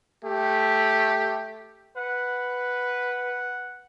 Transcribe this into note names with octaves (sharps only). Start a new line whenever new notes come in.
A3 G4
B4 F#5